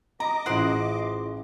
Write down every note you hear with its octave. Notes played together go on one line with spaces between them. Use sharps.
D#5 A#5 B5 D6
A1 E4 F4 G#4 C5 F#5 D7